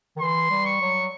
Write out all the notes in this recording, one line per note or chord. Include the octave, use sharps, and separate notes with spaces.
D#3
E3 C6
G3
C#6
F#3